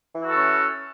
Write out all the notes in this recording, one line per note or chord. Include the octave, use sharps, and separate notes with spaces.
E3 C#4 E4 F#4 A4